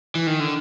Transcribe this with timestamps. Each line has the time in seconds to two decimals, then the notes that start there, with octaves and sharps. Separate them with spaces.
0.15 E3
0.27 D#3
0.40 D3